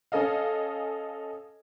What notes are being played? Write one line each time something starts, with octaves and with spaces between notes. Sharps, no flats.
C#4 A4 D#5 F5